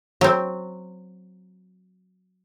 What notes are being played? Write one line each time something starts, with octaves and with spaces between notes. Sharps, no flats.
F#3 C4